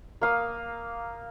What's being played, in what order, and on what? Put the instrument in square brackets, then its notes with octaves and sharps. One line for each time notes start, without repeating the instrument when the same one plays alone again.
[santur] A#3 F5 D#6